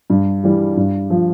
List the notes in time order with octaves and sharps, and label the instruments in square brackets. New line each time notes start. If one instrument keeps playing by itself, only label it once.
[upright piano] G2
E3 G3
G2
F3